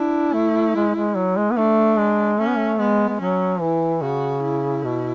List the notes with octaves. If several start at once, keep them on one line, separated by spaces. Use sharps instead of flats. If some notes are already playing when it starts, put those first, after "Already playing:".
Already playing: D4 E4
A3
G#3
G#3
F#3
G#3
B3
A3 D4
G#3
A3 C#4
B3
A3
G#3 B3
G#3
F#3 C#4
E3 E4
C#3 F#4
E4
B2